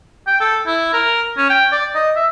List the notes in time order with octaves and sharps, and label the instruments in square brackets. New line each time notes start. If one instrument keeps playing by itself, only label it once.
[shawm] G5
A4
E4
A#4
C#4
G5
D5
D#5
E5